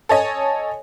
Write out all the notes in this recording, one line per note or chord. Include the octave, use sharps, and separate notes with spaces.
A4 C#5 D#5 G#5